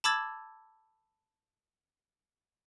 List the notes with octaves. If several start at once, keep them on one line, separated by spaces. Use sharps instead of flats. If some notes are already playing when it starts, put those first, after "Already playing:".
A5 B5 D6 E6 G#6 A6